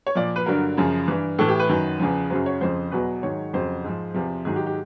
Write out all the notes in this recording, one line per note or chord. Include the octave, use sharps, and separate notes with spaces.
C#5
A#2 F3 D5
B4
G2 D3 F#3 A#4
F#2 C#3 F3
G2 E3
A2 E3 A4
G4
B4
F#2 D#3 F#3
E2 C#3 F3
F#2 C#3 F#3 C5
C#5
F2 C#3 F3 C5
E2 B2 F#3 B4
G#2 D#3 F#3 C#5
F2 C#3 F#3 C5
G#2 F3
E2 C3 F3
G#2 D#3 F#3 G#4
G4
G4